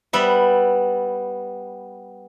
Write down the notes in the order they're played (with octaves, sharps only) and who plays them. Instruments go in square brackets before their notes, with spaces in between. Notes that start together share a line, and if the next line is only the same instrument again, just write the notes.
[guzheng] G3 B3 E5